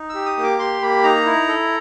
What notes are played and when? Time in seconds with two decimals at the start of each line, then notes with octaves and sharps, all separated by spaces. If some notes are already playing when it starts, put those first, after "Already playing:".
Already playing: D#4
0.10 G4 E6
0.26 D#6
0.37 A#3
0.43 D6
0.59 G4 C6
0.81 A#3 B5
1.03 D#4 A#5
1.26 E4
1.48 A4